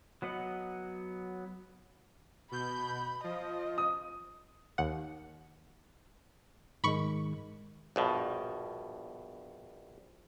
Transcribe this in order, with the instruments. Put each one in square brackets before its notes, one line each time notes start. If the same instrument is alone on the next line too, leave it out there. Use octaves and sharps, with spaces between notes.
[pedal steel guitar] F#3 B3 D#5 F#5
[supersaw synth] B2 G6 [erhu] B5
[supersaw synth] F3 [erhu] D#5
[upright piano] D#6
[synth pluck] D#2 F#5
[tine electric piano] G#2 D#3 G#3 [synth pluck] B5 C#6
[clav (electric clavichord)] A#1 G2 B2